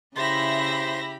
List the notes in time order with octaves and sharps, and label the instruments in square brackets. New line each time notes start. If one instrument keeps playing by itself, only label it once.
[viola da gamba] C#3 E4 [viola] G4 B5 [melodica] C5 C6 [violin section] E5 A#6